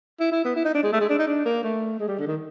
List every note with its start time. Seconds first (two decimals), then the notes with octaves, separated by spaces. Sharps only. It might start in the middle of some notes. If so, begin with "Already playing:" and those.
0.20 E4
0.32 E4
0.45 B3
0.56 E4
0.65 D#4
0.74 D4
0.83 G#3
0.93 A3
1.01 G#3
1.10 D4
1.19 D#4
1.27 D4
1.45 A#3
1.63 A3
2.00 G#3
2.08 G3
2.19 D3
2.27 D#3